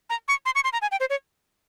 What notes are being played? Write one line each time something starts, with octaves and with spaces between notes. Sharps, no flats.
A#5
C#6
C6
C#6
C6
A#5
G#5
G5
C5
C#5